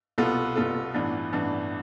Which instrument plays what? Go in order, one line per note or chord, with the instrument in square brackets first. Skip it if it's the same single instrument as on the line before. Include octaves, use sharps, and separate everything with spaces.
[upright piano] C2 B2 B3 F4 A4
C2 B2 B3 F4 A4
A1 G2 E3 B3 D4
A1 G2 E3 B3 D4